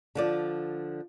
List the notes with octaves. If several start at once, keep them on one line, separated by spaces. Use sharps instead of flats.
D3 F3 D5